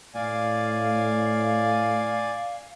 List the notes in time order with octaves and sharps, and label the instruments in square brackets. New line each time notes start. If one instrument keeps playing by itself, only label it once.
[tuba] A2 [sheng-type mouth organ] D5 G#5 [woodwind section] F5